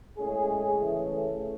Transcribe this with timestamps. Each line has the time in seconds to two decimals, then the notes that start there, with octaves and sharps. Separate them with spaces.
0.17 A2 G#3 C#4 G#4
0.78 C#3 E3 A3